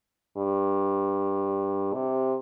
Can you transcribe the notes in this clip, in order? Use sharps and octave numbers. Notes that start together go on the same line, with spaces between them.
G2
C3